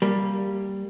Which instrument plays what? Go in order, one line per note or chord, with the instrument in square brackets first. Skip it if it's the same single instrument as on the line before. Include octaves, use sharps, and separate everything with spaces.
[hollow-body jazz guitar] G3 A#3